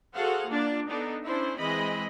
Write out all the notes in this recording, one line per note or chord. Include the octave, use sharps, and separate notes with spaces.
F#4 G#4 A4 C5 F5 F#5
A#3 D4 F4 D5
B3 D4 D#4 A4
C#4 D4 E4 C5
E3 G#3 C4 D#5 B5